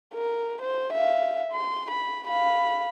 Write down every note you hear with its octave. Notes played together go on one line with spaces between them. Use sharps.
A#4
C5
E5 F5
C6
B5
F5 B5